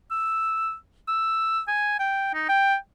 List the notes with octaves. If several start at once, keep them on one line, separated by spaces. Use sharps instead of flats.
E6
E6
G#5
G5
D#4
G5